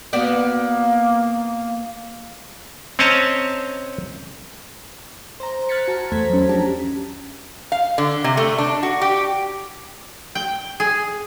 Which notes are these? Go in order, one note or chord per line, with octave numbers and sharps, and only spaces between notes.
A#3 B3 F#4 D5
C4 C#4 C#5 D#5 A5 A#5
C5 A#5
F6 F#6 G#6 A6 B6 C#7
F#4 A5 A#5
E2 A3 C5 A#5 G#6 B6
F#3 C#4
F3 D4 G4 A5 A#5
F5
D3
C3
A3
D4
F#4
G4
G5
G#4